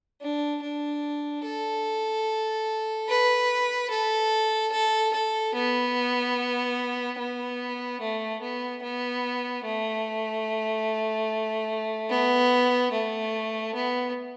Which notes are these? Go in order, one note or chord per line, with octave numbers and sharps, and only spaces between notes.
D4
D4
A4
B4
A4
A4
A4
B3
B3
A3
B3
B3
A3
B3
A3
B3